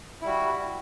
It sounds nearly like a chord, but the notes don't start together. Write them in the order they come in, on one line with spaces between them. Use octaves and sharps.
E4 G3 F#4